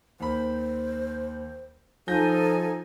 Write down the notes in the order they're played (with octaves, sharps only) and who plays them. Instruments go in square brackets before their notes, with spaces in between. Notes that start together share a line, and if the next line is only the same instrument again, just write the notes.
[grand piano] D#2 B5 [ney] C5
[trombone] F3 [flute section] D#4 G#5 [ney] A4 [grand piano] G6 A#6